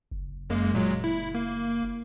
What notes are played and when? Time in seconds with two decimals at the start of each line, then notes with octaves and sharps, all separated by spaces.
0.11 F#1
0.50 F#2 G#3 A#3
0.74 A#2 F#3 G#3
1.04 E4
1.35 A#3